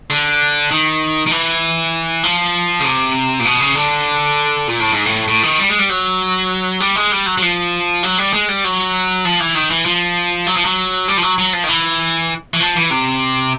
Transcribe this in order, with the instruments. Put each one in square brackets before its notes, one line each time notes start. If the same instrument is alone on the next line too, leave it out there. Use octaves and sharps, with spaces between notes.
[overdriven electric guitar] D3
D#3
D#3
E3
F3
C#3
C3
A#2
B2
C#3
D3
A#2
A2
G#2
A2
A2
D#3
G3
G#3
G3
F#3
G3
G#3
G3
F#3
F#3
F3
F#3
G3
G#3
G3
F#3
F3
E3
D#3
E3
F3
F#3
F3
F#3
G3
F3
F#3
F#3
F3
D#3
E3
E3
F3
E3
C3